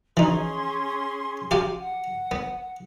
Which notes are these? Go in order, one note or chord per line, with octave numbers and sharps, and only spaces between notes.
E3 C#4 D#4 G#4 C6
G4 F5 G#5
F#5
B3